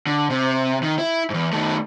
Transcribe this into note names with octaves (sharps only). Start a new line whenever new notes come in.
D3
C3
D#3
E4
E2 G#2
D#3 A3